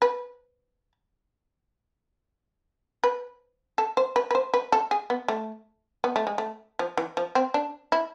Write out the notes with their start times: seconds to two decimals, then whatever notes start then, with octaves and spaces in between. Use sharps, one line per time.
0.02 B4
3.04 B4
3.78 A4
3.97 C5
4.16 B4
4.31 B4
4.35 C5
4.54 B4
4.72 A4
4.91 G#4
5.10 B3
5.28 A3
6.04 B3
6.16 A3
6.27 G#3
6.38 A3
6.79 F3
6.97 E3
7.17 F3
7.35 C4
7.54 D4
7.92 E4